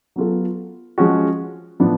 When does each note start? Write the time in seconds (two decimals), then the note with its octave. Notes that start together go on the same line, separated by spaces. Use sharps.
0.16 F#3 B3 F4 A4
0.98 F3 G#3 C#4 F#4
1.80 A2 F3 B3 D4